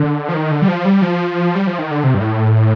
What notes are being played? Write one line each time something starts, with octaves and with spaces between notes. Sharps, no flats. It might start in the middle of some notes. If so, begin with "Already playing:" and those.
Already playing: D3
F3
D#3
D3
G3
F3
G3
F3
G3
F3
D#3
D3
C3
G2
A2